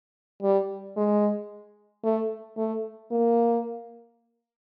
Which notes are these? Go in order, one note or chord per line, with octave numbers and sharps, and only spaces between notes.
G3
G#3
A3
A3
A#3